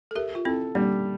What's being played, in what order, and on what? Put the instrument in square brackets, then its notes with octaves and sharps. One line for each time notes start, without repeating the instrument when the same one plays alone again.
[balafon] A4
[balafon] G4 A#4 [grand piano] E5
[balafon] F4
[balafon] C4 E4 [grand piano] A4
[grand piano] G3 [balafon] A#3 D4